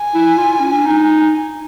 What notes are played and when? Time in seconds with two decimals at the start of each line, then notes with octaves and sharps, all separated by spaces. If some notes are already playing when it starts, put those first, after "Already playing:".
Already playing: G#5
0.15 E4
0.38 F4
0.60 C#4
0.72 D4
0.86 D#4